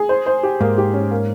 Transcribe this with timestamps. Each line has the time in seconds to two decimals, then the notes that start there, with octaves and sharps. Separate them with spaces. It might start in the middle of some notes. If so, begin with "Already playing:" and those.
Already playing: G#4
0.09 C5
0.26 C5
0.43 G4
0.61 G#2 A#3
0.78 G4
0.94 C#4
1.11 A#3